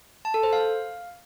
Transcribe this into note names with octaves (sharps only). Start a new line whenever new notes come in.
A5
A4
C5
F5